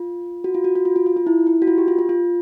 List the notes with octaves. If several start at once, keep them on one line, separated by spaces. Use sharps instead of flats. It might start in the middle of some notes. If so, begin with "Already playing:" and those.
Already playing: F4
F#4
F4
F#4
F#4
F4
F4
F4
F4
E4
E4
F#4
F4
G4
F4
F4
F4